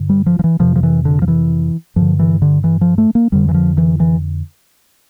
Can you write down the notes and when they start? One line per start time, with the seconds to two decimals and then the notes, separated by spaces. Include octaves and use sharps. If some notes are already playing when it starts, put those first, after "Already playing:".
Already playing: G2 D3
0.09 G3
0.26 F3
0.39 F3
0.44 E3
0.60 F2 C3 F3
0.76 F3
0.83 E3
1.05 D3
1.22 F3
1.28 E3
1.96 G2 D3 F3
2.19 E3
2.42 D3
2.64 E3
2.81 F3
2.98 A3
3.15 A#3
3.32 F2 D3 G3
3.49 E3
3.54 F3
3.78 E3
4.00 E3